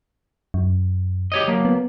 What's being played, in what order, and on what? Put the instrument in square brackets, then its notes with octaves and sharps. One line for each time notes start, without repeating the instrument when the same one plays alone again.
[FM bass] F#2
[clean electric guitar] G4 C#5 D#5
F#3 A#3
[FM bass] B3